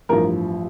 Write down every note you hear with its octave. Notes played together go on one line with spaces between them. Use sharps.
A1 G2 F3 A#4